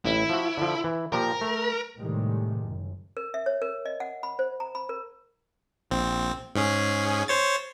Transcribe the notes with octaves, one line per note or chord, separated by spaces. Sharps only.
A1 E4
F3 F#4
D3 F3
E3
A#2 F3 G4 A#4
A3
A2 C3 D#3 G3 G#3
F#1
A#4
E5
C#5
A#4
D#5
F#5
B5
C5
A#5
B5
A#4
A#1 C4
G#2 C#4 G#4
C5 C#5 A6